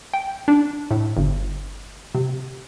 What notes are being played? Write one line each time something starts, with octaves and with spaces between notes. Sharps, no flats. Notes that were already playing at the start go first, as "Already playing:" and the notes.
G5
D4
A2
G1
C3